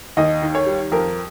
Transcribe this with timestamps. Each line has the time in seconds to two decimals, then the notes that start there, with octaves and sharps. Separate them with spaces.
0.17 D#2 D#5
0.42 D#3
0.55 C#5
0.66 G3
0.92 F2 A#4